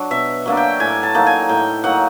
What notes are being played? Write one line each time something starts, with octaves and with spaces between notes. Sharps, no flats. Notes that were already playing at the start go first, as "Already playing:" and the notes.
Already playing: F#3 D4
B2 E5
F#3 A#3 D4
G5
A2 G#5
A5
F#3 A#3 D#4
G#5
A2 G5
F#3 A#3 D#4 F#5